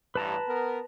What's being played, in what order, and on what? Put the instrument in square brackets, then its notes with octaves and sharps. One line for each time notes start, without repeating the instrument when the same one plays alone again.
[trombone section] A1 G2 [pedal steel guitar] B4 A5 A#5
[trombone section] B3 A#4